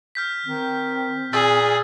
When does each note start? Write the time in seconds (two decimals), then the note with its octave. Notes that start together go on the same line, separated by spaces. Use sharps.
0.15 F6 G6 B6
0.46 D#3 C4
1.33 A#2 G#4 E6 A6 B6